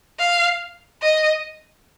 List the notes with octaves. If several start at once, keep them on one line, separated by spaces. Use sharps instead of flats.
F5
D#5